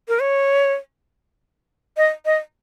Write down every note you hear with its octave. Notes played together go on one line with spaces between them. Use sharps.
A#4
C#5
D#5
D#5